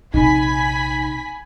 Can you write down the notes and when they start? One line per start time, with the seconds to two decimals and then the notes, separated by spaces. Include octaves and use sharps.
0.14 A#1 C3 D#4 G#5 B5 B6